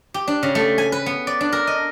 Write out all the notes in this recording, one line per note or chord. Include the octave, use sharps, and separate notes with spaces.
G4
D4
C#3
A3
G#5
B4
B3
D5
D4
A#4
D#5